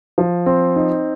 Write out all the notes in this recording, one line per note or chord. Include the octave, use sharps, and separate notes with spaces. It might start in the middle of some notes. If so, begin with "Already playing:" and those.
F3
C4
D#4